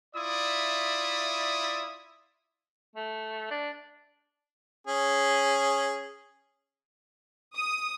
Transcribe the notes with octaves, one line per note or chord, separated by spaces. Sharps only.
E4 F4 D5 E5 D#6
A3
D4
C#4 G#4
D#6